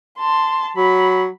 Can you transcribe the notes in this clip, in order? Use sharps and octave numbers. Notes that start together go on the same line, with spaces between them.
A5 C6
F#3 B5